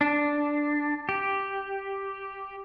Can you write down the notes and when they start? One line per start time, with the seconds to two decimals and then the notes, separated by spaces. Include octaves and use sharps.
0.01 D4
1.09 G4